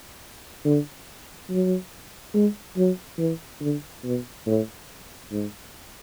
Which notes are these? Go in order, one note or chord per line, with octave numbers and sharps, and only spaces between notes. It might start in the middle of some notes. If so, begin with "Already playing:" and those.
D3
F#3
G#3
F#3
E3
D3
B2
A2
G#2